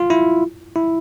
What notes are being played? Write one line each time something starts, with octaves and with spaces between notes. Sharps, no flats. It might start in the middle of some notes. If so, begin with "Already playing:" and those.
Already playing: F4
E4
E4